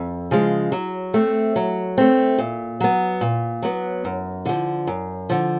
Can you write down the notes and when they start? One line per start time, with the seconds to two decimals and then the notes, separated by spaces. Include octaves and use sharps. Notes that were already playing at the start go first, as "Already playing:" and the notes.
Already playing: F2
0.31 C#3 F3 G#3
0.72 F#3
1.14 A3 C4
1.56 F#3
1.98 A3 C4
2.38 A#2
2.80 F#3 B3
3.21 A#2
3.62 F#3 B3
4.05 F#2
4.46 D3 F3
4.87 F#2
5.30 D3 F3